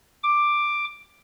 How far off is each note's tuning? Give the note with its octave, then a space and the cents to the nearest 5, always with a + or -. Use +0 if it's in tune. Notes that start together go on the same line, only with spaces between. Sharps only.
D6 +10